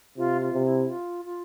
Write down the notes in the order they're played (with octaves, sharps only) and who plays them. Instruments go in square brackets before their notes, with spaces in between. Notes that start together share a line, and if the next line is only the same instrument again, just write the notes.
[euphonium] C3 [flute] F4
[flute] F4
[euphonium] C3
[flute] E4
F4
F4